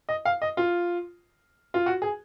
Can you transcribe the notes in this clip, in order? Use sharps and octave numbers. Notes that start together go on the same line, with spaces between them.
D#5
F5
D#5
F4
F4
F#4
G#4